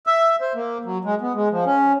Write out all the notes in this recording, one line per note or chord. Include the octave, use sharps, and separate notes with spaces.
E5
C5
A#3
F#3
G#3
B3
G#3
F3
C#4